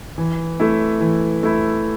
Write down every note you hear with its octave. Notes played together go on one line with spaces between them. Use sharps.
E3
A3 E4
E3
A3 E4